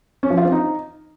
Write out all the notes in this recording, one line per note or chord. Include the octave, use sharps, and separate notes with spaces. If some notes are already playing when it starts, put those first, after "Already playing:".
C#4
F3
F4
C4
D#4